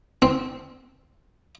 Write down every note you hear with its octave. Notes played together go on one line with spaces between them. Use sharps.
C4